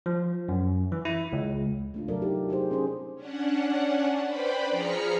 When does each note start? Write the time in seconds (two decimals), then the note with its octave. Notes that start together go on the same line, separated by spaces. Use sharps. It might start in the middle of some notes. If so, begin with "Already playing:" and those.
0.06 F3
0.49 F#2
0.92 E3
1.05 E4
1.33 C#2
1.94 A3 D4 F4
2.08 C3 F#3 A4 A#4 D5
2.22 D#4 G4
2.49 D#4 G4 G#4 C5
2.70 C4 C#4 D#4 G#4 C5
3.15 C#4 D4 F#5
4.25 B4 C5 D5 G5 B5
4.70 F3 G#4 A#5 F6 B6 C#7